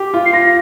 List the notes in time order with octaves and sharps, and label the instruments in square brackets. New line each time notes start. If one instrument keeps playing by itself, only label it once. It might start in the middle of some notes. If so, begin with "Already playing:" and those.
Already playing: [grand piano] G4
F4
[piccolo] C7
[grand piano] F4 [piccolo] A#6